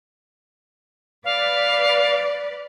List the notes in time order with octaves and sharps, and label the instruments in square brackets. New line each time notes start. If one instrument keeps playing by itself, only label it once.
[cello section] B4 D5 [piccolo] F5